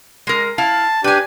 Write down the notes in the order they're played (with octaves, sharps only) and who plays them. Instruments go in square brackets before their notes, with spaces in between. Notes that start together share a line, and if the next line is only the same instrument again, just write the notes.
[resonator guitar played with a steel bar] G#3 A#4
[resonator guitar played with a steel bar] E4 F5 [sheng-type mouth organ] A5
[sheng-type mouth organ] D4 G4 [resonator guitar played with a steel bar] B4 G#5